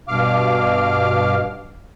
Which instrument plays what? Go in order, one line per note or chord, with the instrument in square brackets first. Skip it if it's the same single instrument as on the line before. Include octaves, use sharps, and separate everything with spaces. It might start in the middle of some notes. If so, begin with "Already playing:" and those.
[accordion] G2 B2 F5 D6 F6